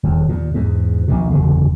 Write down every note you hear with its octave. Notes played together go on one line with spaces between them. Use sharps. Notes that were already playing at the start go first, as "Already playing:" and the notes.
D#1 E2
D#2 A#2
E2 G#2
A#1 D#2 B2
F#1 E2 D3